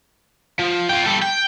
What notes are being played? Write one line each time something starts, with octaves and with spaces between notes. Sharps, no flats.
F3
F4 G5
G3 A4
G5